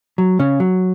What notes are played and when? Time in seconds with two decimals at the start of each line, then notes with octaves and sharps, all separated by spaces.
0.18 F#3
0.39 C#3 C#4
0.60 F#3